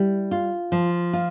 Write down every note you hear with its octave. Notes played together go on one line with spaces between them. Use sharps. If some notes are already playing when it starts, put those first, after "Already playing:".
Already playing: G3 E4
F4
F3
F4